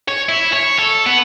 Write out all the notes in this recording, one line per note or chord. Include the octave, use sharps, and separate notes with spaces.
C#5
E4
C#5
A4
B3